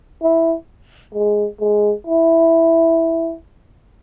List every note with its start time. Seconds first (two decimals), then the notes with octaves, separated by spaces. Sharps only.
0.23 E4
1.14 G#3
1.60 G#3
2.07 E4